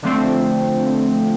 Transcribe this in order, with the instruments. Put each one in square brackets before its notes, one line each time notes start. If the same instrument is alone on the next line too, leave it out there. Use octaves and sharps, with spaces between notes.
[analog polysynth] D3 F3 A3 C4